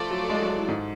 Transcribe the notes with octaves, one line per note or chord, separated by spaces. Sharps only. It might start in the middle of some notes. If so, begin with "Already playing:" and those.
Already playing: F3 A3 F4 A4 D5
F#3
G#3
F#3
A2
G#2